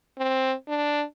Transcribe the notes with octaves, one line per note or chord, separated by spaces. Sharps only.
C4
D4